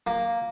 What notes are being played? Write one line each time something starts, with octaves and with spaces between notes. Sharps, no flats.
A#3